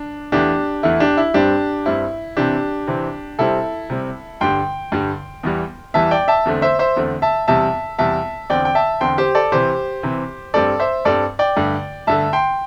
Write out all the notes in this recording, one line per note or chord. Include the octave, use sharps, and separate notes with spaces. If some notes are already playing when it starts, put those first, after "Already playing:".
Already playing: D4
E2 E3 A3 D4 G4
E2 E3 A3 E4
D4 G4
E4
G2 G3 C4 D4 G4
G2 G3 C4 E4
C3 E3 C4 D4 G4
C3 E3 C4
C3 G3 C4 E4 A4
C3 G3 C4
G2 D3 G3 G5 C6
G2 D3 G3
E2 E3 G3
E2 E3 G3 E5 A5
D5 G5
E5 A5
E2 D3 A3 C4
C5 E5
C5 E5
E2 D3 A3 C4
E5 A5
E2 C3 G3 E5 A5
E2 C3 G3 E5 A5
E2 D3 C4 D5 G5
G5
E5 A5
E2 D3 C4 G5 C6
G4 C5
A4 D5
C3 E3 C4 G4 C5
C3 E3 C4
G2 G3 C4 A4 D5
C5 E5
G2 G3 C4 A4 D5
D5 G5
G2 D3 A3
G2 D3 A3 E5 A5
G5 C6